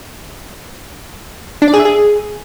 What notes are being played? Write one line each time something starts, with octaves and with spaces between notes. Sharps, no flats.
D4
D5
G#4
E5
G#4